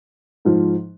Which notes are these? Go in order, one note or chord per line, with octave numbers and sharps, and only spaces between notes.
G#2 F3